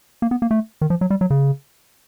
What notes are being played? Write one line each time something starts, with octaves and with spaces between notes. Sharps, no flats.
A#3
B3
A#3
A3
D#3
F3
F#3
G3
F#3
C#3